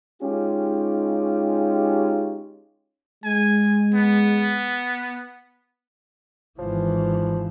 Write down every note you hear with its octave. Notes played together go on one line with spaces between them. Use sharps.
G#3 C#4 D#4 F4 G4
G#3 G#5
B3
G#1 E3 F3